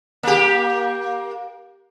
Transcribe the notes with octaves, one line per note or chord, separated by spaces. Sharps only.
A#3 G4